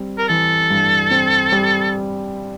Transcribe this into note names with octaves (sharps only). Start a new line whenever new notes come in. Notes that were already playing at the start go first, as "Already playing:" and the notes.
Already playing: G3 C4
A#4
E3 A4
G2
C4
G3